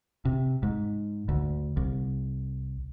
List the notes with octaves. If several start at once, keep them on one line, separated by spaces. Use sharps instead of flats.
C3
G#2
D2
C2